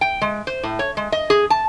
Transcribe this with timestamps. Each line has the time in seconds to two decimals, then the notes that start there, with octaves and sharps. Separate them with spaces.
0.01 G5
0.22 G#3
0.47 C5
0.63 A2
0.79 C#5
0.97 G#3
1.12 D#5
1.30 G#4
1.50 A5